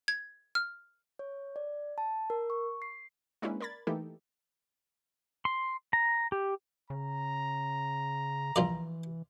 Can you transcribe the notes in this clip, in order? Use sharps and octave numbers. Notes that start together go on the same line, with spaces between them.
G#6
F6
C#5
D5
A5
A#4
C#6
C7
G#3 A#3 C#4 D4 E4 B4
A#4 D5 B5 G#6 A6
E3 A3 A#3 D#4 G4 A4
C6
A#5
G4
C#3 A#5
A#1 E3 F4 D5